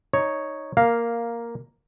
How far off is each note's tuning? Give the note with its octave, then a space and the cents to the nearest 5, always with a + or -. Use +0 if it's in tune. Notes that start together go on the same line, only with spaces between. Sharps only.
D#4 +0 C#5 +0
A#3 +0 F5 +0